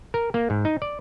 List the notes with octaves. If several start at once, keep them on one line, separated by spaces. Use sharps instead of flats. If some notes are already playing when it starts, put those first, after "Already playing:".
A#4
A#3
G#2
D#4
D5